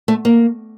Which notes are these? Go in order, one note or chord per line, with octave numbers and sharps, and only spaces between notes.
A3
A#3